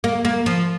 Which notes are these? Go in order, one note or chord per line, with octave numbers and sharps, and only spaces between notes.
A#3
A#3
F3